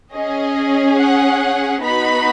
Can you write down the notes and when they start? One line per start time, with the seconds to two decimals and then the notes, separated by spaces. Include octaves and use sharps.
0.12 C#4 G#4 D#5
0.97 F#5
1.82 B3 D#4 F#4 B5